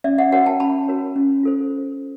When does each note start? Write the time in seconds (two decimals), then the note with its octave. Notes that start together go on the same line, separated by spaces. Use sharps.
0.04 C#4 D5 E5
0.18 E5 F#5
0.32 F#4 A#4 C#5 F#5 G#5
0.46 G5 A5
0.60 C#4 A5 B5
0.88 F#4 A#4 C#5
1.16 C#4
1.43 F4 A4 C5